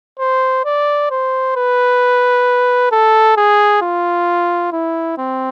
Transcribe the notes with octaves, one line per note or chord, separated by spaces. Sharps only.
C5
D5
C5
B4
A4
G#4
F4
E4
C4